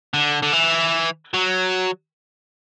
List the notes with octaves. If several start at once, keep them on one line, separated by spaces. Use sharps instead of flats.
D3
D3
E3
F#3